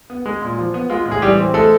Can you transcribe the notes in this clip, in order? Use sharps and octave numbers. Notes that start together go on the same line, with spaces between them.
B3
G#3
A#2
F3
B3
G#3 F4
A2
G#4
E3 G3 G4
C4
G#3 A3 A4